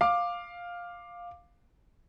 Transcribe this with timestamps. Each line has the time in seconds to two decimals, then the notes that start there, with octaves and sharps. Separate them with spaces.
0.01 F5 D6